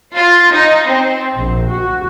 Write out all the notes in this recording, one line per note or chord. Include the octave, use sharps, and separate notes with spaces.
F4
D#4
C4
A#1
F#4